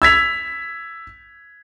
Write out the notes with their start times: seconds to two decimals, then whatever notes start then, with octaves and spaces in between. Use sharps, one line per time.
0.02 E6 G#6 B6 F7